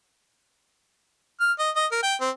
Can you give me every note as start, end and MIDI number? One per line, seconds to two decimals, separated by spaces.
1.41 1.52 89
1.59 1.70 75
1.76 1.86 75
1.92 1.99 70
2.03 2.15 79
2.21 2.30 60